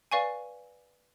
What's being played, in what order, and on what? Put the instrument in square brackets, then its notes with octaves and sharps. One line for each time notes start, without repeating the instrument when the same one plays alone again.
[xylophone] B4 D5 F5 G#5 C#6